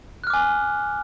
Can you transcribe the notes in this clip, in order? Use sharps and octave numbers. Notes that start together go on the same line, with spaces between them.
G#5 D6 F6 F#6